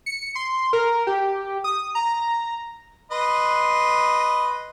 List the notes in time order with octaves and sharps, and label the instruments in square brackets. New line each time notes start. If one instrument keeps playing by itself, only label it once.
[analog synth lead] C#7
C6
A#4
G4
D#6
A#5
[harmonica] B4 D#5 C6